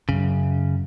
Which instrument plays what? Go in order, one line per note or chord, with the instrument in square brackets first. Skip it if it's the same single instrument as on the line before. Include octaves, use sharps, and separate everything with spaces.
[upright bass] F#2 [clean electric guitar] C#3